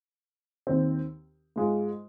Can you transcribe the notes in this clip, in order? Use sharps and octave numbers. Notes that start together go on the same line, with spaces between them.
D#2 D#3 C4
G#2 G#3 F4